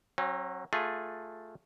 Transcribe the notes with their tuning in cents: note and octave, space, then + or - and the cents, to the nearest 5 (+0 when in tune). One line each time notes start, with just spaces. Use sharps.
F#3 +0 C4 +45
A3 +0 F4 +15 G#4 +0